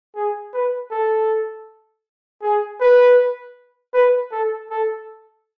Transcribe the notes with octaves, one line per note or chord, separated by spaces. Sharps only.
G#4
B4
A4
G#4
B4
B4
A4
A4